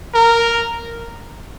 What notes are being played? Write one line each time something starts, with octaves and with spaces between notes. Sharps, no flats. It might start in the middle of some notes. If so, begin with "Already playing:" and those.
A#4